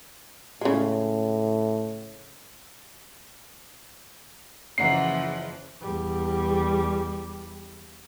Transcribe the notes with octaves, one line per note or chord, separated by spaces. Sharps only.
A2 C#3 G#3
F#1 C#3 E3 F3 F#5 A#5 C7
E2 G3